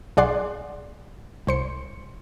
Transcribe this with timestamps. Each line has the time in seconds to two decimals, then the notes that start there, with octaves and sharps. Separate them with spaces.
0.17 B1 G#4 D5 F#5 C6
1.47 C2 C5 C#7